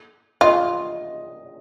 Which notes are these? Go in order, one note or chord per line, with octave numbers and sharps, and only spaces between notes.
F4 D#5